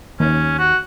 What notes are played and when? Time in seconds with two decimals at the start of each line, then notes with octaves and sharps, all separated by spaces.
0.20 D#2 C#4
0.59 F#4